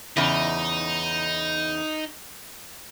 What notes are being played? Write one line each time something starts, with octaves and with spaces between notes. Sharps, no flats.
E2 C#3 D#4